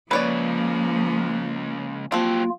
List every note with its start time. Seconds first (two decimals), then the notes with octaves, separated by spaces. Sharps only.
0.11 C#2 C#3 F3 A#3 B4 C#5 D5
2.12 F3 F#3 A#3 C4 F4 G4